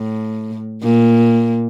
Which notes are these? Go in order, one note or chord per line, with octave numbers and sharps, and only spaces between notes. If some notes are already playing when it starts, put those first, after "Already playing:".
Already playing: A2
A#2